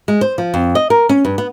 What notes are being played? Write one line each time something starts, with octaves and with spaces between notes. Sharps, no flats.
G#3
C5
F3
F2
D#5
A#4
C#4
G2
B3